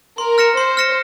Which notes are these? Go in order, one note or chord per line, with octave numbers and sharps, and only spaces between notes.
A#4 C6
F6 A#6 C#7 E7
C5 C6
F6 A#6 C#7 E7